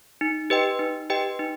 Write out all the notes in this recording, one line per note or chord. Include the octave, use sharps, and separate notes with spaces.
D#4
G4 B4 D#5 G5
D#4
G4 B4 D#5 G5
D#4